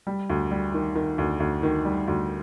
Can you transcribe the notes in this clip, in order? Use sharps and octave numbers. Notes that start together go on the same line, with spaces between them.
G3
D2
G3
D#3
D#3
D2
D2
D#3
G3
D2